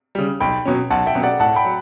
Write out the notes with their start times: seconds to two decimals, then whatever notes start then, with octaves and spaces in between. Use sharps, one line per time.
0.15 C#3 G3
0.40 B1 G5 B5
0.65 B2 F#3 C#4
0.90 B1 F#5 A5
1.06 E5 G5
1.14 B2 F#3 C#4
1.23 D5 F#5
1.39 A2 F#5 A5
1.56 G5 B5
1.65 F#3